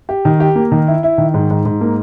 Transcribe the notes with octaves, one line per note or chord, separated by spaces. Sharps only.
G4
D#3
G4
A#3
D#3
E4
E4
D#3
G#2
G#2
G#2
A#3